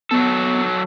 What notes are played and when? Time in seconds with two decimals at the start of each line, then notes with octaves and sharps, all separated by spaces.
0.11 F#3 B3 A4